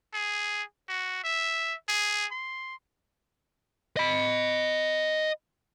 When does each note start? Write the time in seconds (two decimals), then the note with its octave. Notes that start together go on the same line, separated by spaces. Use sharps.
0.14 G#4
0.89 F#4
1.24 E5
1.89 G#4
2.31 C6
3.97 D#5 B5